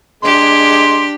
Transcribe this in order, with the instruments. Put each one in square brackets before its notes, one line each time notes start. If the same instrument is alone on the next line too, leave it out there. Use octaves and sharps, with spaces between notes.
[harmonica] G#3 C6 [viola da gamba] D4 G4